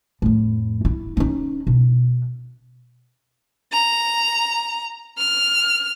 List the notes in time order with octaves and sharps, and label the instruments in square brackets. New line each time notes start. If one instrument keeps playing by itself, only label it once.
[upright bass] F2 A2
E4
C#4 D#4
B2
[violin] A#5
F6